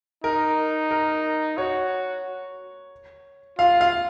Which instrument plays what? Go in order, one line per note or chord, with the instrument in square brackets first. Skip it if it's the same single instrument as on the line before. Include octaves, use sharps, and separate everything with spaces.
[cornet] D#4 [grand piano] A#4
[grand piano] A#4
[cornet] F#4 [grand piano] C#5
[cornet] F4 [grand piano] F5
[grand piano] F5